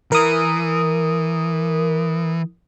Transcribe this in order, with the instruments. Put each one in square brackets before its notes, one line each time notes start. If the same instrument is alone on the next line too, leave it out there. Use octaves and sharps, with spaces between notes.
[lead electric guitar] E3 [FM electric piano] A#4 D#6